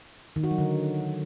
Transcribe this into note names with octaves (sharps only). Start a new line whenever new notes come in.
D#3
F#4
F#3
D3